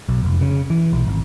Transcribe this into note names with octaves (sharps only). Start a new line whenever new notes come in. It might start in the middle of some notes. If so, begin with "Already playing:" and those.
B1
F1
C#3
E3
B1
G#1